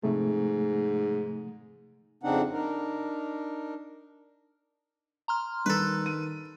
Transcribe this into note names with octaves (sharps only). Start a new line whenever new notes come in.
G#2 C3 F3 A3
F2 C#3 C4 D4 D#4 F#5
D4 D#4 A#4
A#5 C6 F6
D#3 G3 A4 B4
D#7